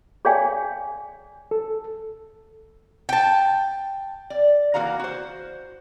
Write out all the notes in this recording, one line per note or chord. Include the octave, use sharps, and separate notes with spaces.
G#4 C#5 D5 F5 G5 G#5
A4
G5 A5
D5
E3 A#3 F#4 F5 A#5
F#4 C5